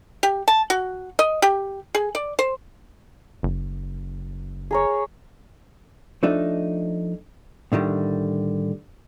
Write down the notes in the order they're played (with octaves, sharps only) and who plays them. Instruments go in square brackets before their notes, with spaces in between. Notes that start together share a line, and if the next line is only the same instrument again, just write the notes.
[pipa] G4
A5
F#4
D#5
G4
G#4
D5
C5
[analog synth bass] F#1
[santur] G#4 A#4 C#5
[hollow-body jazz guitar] F3 A3 D4 D#4
A2 D3 D#3 G3